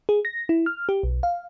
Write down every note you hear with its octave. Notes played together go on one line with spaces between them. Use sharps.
G#4
A#6
E4
F6
G4
B1
F5